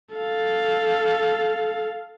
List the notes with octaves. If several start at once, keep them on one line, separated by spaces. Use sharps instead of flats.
A4 F5